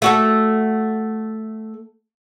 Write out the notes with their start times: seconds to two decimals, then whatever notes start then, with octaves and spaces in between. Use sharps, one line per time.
0.02 A3 F#4 A4